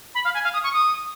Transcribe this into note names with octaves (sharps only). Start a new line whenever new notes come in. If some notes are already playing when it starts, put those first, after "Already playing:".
B5
F5
G#5
F5
D#6
C#6
D#6